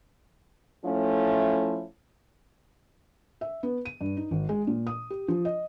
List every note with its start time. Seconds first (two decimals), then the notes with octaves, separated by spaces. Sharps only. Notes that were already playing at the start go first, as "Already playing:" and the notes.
0.84 F3 A3 C#4 E4
3.41 E5
3.63 B3
3.85 D#7
4.01 G2
4.17 D#4
4.31 G#1
4.49 G#3
4.67 A#2
4.87 D#6
5.10 G4
5.28 F3
5.45 D#5